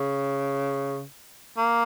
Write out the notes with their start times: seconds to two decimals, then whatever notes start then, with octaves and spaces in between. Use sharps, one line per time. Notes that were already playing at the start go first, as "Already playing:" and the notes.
Already playing: C#3
1.58 A#3